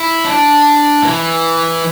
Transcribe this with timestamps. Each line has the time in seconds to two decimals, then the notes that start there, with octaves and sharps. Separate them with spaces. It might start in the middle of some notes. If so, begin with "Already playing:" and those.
Already playing: E4
0.25 D4
1.03 E3